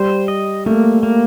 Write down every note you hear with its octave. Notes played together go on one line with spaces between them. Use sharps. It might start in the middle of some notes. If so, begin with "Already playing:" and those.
Already playing: G3 C5
D#5
A3 A#3
A#3